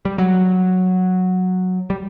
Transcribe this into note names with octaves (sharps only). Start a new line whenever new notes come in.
G3
F#3
G3